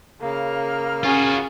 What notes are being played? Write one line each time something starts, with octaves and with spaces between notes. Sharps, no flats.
C#3 A#3 F6
C#4 F4 F#4 G#4